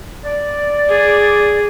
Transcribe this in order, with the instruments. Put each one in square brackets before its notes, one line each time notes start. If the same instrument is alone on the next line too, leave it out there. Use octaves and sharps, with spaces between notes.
[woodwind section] D5
[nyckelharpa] G#4